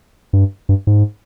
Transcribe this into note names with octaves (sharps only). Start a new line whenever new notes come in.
G2
G2
G#2